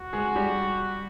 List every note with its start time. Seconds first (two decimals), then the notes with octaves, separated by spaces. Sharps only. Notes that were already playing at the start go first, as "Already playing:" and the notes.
Already playing: F#4
0.13 G#3 G#4
0.36 G3 G4